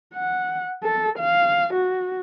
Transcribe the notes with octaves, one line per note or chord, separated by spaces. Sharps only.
F#5
A4
F5
F#4